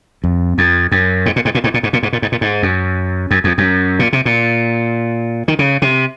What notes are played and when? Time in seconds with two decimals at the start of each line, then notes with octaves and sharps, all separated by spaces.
0.24 F2
0.58 F2
0.92 F#2
1.26 G#2
1.36 A#2
1.45 G#2
1.55 A#2
1.64 G#2
1.74 A#2
1.83 G#2
1.93 A#2
2.03 G#2
2.13 A#2
2.22 G#2
2.32 A#2
2.41 G#2
2.63 F#2
3.31 F#2
3.44 F2
3.58 F#2
3.99 A#2
4.13 C3
4.26 A#2
5.48 D#3
5.59 C#3
5.82 C3